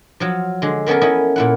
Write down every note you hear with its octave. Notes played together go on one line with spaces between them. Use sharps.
F3 F#3
D3 G#3
A#3 B3 C#4 A4 A#4
C#4 E4 D#5
A#2 E4 F#5